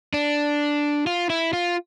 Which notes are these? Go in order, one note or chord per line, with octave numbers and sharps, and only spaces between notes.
D4
F4
E4
F4